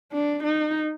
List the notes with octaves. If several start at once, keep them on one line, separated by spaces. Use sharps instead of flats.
D4
D#4